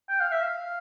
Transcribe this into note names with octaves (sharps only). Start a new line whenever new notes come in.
G5
F5
E5
F5